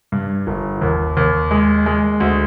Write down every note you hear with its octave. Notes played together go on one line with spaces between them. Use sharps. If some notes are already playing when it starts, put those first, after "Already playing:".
G2
G1
D#2
D#2
G#3
G#3
D2